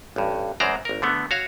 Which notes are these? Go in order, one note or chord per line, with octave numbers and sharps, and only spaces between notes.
A1 G2
F#2 E3 G#3 C5 D5 A#5
G#1 A#4
D3 A3 B3
F#4 C#5 F5